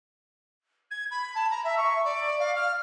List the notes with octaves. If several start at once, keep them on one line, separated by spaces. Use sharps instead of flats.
G#6
B5
A5
A#5
E5
C#6
D5
F5
F6